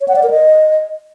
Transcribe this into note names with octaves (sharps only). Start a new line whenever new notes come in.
C#5
F#5
D5
A#4
D#5